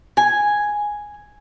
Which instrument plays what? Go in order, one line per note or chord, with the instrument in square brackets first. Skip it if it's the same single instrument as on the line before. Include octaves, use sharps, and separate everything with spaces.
[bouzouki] G#5